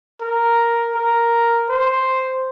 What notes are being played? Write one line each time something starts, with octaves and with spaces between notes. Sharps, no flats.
A#4
A#4
C5